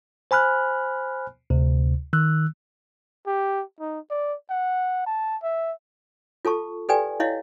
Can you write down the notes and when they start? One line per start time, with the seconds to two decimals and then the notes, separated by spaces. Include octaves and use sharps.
0.31 C5 G#5 B5 F6 F#6
1.50 D2 C3
2.13 D#3 E6 F#6
3.27 G4
3.80 D#4
4.11 D5
4.50 F#5
5.06 A5
5.43 E5
6.45 F4 A4 A5 C#6
6.89 G4 A4 B4 D5 G5 G#5
7.20 E4 C#5 D#5 F5